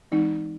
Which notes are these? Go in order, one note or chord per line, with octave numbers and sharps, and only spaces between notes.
E3 G#3 C4 D#4